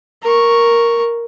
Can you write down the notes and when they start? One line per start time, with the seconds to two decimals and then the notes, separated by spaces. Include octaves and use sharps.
0.22 A#4 C#6